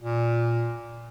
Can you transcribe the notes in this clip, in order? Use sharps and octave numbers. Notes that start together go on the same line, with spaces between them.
A#2